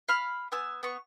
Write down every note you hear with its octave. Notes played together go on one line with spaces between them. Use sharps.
F5 B5 F6
B3 G#5 E6
B3 C#6